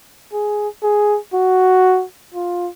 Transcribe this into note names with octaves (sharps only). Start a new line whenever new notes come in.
G#4
G#4
F#4
F4